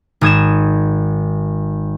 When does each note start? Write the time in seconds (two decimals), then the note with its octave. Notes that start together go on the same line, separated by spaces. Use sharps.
0.21 G#1 D#6 G#6 E7